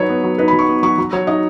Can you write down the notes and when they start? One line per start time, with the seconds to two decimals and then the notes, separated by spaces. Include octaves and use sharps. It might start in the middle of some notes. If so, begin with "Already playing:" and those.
Already playing: F#3 D#4 B4 C#5
0.09 B3
0.24 F#3
0.38 D#4 B4
0.48 B5
0.53 F#3
0.59 C#6
0.69 B3
0.83 F#3 C#6
0.98 F#3
1.13 F#3 C#5
1.27 D#4 D#5